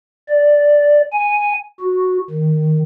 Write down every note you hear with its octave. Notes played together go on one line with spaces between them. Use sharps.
D5
G#5
F#4
D#3